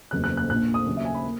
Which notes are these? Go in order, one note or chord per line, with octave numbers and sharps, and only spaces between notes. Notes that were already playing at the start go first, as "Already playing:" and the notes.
F#1 E2 C#3 F#3 F#6
F#6
F#6
A#1 A#2 A#3 F#6
D#6
D#2 C#3 F#3
E5
G#5
B5
A#3